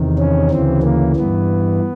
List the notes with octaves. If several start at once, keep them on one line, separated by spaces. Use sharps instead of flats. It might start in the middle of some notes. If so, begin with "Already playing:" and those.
Already playing: E2 C3 D#3
C#4
D2 C#3 E3 C4
A#3
G2 E3 B3